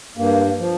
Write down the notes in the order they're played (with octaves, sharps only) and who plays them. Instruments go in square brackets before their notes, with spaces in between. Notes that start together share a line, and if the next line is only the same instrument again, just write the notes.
[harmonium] G2 A#3
F3